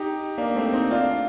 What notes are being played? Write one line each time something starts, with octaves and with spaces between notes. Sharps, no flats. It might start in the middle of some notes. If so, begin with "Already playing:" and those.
Already playing: D#4 G4
A#3 D4
A3 C4
C4 D#4
D4 F4